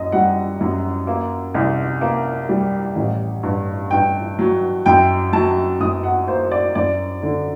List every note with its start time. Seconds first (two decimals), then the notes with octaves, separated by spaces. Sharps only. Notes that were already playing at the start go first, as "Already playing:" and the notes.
Already playing: F#2 D#5
0.12 G3 F#5
0.61 F#2
1.07 A#3
1.54 C2
2.01 A#3
2.49 G3
2.96 A1
3.43 G2
3.91 G2 G5
4.39 F#3
4.86 F#2 G5
5.33 F#3 A5
5.80 F#2 D#6
6.03 F#5
6.27 A#3 C5
6.51 D5
6.75 F#2 D5
7.23 D3